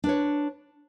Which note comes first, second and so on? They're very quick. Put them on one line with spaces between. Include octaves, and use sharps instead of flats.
D4 B4 C#5